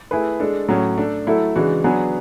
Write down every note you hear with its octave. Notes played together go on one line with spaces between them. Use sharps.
A3 E4 G#4 B4
G#3 D4 A4
A2 F#3 C#4
A3 D4 A4
F#3 A3 E4 A4
C#3 E3 G#3 D4 F#4
F#3 B3 D4 G#4 B4